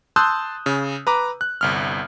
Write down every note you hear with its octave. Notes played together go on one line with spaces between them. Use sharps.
A5 C6 D#6 E6 F#6 G6
C#3
B4 A#5 D6
F#6
G1 C2 F6